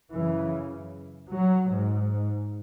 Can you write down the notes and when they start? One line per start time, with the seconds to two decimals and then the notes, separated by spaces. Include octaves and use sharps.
0.12 F#2 C#3 E3
1.33 F#3
1.73 G#2